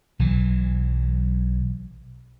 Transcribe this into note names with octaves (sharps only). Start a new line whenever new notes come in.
B1 E3 F#3